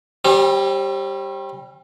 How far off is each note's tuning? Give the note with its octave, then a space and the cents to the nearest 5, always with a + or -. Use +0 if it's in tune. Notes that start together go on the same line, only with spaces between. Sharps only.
G3 +0 C4 +45